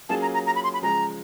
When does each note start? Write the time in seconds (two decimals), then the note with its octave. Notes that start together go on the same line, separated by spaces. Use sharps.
0.09 F#3 A#3 C#4 F4 G#4 A5
0.22 A#5
0.34 A#5
0.46 A#5
0.55 B5
0.64 C6
0.74 B5
0.83 C#3 F3 G#3 A#5